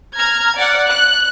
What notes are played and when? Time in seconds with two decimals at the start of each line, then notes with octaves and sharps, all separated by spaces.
0.16 A#5 F6 G#6
0.55 D5 F#5
0.86 F#6